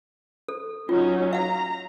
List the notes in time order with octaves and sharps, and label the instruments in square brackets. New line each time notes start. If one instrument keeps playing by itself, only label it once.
[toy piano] A4
[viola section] F#3 C#4 D#4 [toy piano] F4
[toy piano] F5 F#5 [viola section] A#5